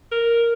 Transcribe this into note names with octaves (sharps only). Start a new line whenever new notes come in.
A#4